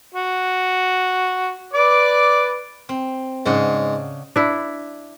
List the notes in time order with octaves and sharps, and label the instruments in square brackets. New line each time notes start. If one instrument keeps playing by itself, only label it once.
[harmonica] F#4
B4 D5 D6
[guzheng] C4
[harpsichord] G#2 [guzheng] C#3 D4 F#5
[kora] D4 E4